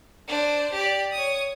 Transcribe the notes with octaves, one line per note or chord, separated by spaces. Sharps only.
D4 C5
G4 D5
C#5 D#6